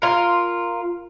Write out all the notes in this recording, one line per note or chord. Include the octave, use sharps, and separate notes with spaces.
F4 A#4